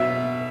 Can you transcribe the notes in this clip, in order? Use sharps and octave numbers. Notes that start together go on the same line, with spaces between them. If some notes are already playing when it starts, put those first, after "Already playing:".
Already playing: B2 F#3 B3 E5